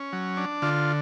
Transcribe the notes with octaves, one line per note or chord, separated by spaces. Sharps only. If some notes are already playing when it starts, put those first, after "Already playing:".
Already playing: C#4
F#3
D4
D3 F4